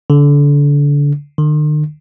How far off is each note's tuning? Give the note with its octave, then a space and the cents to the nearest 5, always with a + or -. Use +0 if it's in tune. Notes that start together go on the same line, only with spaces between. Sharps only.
D3 -30
D3 +45